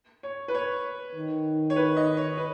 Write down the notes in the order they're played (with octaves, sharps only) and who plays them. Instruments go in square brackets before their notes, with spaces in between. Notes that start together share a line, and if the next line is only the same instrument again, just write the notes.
[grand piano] C#5
B4
C#5
[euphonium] D#3
[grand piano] C#5
B4
D#5
C#5
B4